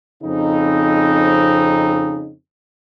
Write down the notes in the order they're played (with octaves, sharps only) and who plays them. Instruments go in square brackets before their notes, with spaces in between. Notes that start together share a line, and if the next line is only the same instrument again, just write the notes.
[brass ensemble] F2 C#3 C4 D#4